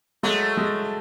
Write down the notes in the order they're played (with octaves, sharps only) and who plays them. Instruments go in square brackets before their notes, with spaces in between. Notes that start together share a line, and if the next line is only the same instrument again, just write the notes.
[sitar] F#3 A3 [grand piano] G#3
[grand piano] G#3